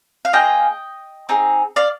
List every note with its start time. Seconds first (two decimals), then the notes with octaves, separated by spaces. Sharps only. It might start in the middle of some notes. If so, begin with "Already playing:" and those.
0.25 F5
0.33 A#3 F4 G#4 D#5 G5
1.29 C4 D#4 G#4
1.76 D5 F5